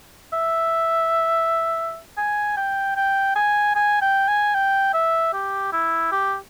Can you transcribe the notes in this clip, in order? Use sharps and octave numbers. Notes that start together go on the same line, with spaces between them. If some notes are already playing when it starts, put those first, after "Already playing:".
E5
G#5
G5
G5
G#5
G#5
G5
G#5
G5
E5
G4
E4
G4